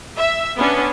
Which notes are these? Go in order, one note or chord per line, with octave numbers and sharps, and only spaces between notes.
E5
B3 C#4 D4